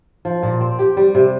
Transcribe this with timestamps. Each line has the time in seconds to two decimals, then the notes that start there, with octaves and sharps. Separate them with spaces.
0.25 F3
0.43 A#2
0.60 C4
0.79 G4
0.97 G3
1.15 C3